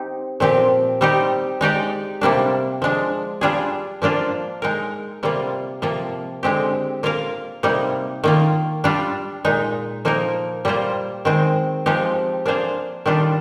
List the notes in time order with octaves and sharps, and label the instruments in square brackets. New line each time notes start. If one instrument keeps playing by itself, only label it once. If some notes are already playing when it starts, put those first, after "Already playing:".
Already playing: [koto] C4 D#4 G4
A#2 F3 C4 G4
G3 C4 D#4 G4
G#3 D#4 G4 D5
C3 G3 A#3 D4
F3 G#3 D4
G3 D4 F4 G#4
F3 A#3 D4 F4
G#3 D#4 A#4
C3 G3 A#3 F4
C3 F3 A#3 F4
D3 G#3 C4 G4
A#3 F4 A#4 F5
C3 G3 A#3 D#4
D#3 A#3 F4
G3 D4 F4
A#2 G#3 D#4
F3 A#3 D#4 A#4
G3 A#3 F4 C5
D#3 G#3 C4
F3 G#3 C4 D#4 G4
A#3 D4 G#4 C5 F5
D#3 G3 D4 F4